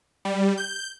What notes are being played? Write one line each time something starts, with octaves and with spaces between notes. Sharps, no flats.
G3
G6